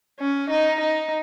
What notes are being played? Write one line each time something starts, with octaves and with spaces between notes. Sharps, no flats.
C#4
D#4
D#4